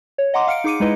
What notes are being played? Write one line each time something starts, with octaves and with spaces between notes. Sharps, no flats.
C#5
D#5 F#5 A#5 C6 D6
F5 F6 C#7 D7
D#4 G#4 D6 C#7 D#7
G#3 D#4 E4 B4 D#5